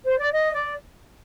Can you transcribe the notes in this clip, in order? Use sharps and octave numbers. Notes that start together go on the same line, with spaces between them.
C5
D5
D#5
D5